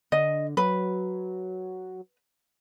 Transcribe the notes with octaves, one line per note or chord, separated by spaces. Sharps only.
D3 D#5
F#3 B4